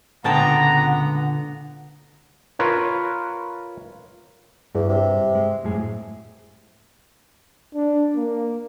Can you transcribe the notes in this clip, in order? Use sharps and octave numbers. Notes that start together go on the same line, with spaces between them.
C#2 A#2 D3 B3 F#5 G5 A5 A#5
F4 A#4 B4 C#5
E2 G2
C3
G#3
F#2 A2 G#4
D4
A#3